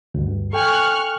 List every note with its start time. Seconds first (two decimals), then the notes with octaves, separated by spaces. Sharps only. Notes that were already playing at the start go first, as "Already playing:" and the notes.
0.14 D2 G2
0.53 A4 G5 G#5 C#6 F6 F#6